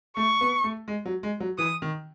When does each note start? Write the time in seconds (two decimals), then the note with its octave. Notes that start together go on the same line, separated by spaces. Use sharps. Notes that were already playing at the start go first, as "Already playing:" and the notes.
0.17 A3 C#6
0.41 B3
0.64 A3
0.88 G#3
1.06 F#3
1.23 G#3
1.40 F#3
1.58 E3 D#6
1.82 D#3